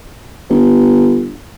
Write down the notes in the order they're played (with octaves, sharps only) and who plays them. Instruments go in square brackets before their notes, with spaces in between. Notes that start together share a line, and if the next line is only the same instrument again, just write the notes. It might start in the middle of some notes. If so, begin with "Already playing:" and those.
[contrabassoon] G1